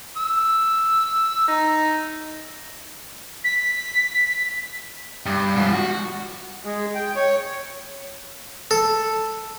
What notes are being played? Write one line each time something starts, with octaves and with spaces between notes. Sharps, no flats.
E6
D#4
B6
G2
G#2 F3
F#4
G#3
G5
C#5
A4